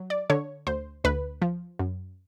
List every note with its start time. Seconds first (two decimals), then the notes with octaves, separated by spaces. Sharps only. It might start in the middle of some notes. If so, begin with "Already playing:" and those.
Already playing: F#3
0.10 D5
0.30 D3 C#5
0.67 D2 C5
1.04 D2 B4
1.42 F3
1.79 F#2